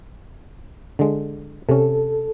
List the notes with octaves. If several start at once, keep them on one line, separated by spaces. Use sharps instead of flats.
D3 G#3
C3 C#4 A4